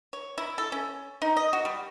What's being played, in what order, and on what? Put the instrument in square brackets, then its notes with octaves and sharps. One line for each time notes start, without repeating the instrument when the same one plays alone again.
[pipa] C#5
E4
A4
C#4
D#4
D#5
F#4
G3